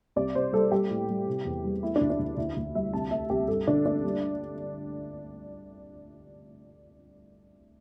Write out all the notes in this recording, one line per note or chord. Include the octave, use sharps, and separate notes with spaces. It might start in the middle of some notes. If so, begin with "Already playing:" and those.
C2 D5
C2 C5
G3 A4
G3 G4
A2
G3
C3
E2
G3
A3 E4
D4
D2
D4
D2 E4
D2 E4
D2
G3 E5
C2 A5
A3 E5
C2 G4
G2 A4
D3 D4
A3 D4
G3